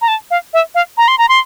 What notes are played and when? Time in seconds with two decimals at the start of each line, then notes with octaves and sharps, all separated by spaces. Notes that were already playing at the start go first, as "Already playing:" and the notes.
0.02 A#5
0.08 A5
0.31 F5
0.54 E5
0.75 F5
0.98 A#5
1.08 C6
1.18 A#5
1.29 C6